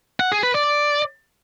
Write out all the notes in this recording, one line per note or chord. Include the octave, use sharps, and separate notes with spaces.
F#5
G#4
B4
D5